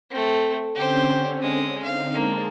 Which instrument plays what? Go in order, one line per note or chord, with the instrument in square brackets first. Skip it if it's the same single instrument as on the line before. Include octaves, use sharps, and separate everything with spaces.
[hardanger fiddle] A3 C4
[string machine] D3 C4 C#4 [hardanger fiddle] G4 C5
[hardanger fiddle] G#3 D#6
[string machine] D3 C4 D#4 [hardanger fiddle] F5
[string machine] G#3 A5 [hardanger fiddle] A#3